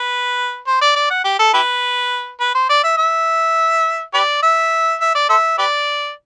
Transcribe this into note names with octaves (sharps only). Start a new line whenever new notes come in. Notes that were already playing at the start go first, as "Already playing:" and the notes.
Already playing: B4
C5
D5
D5
F#5
G4
A4
E4 G4 B4
B4
C5
D5
E5
E5
G4 B4 D5
E5
E5
D5
A4 C5 E5
G4 B4 D5